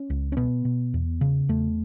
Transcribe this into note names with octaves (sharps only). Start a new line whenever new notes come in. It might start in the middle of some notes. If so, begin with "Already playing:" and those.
Already playing: C#4
C#2
C#4
B2 B3
B2
E2
C#3
E2 A3